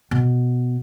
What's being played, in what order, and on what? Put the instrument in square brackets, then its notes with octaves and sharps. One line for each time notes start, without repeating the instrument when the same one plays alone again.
[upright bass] B2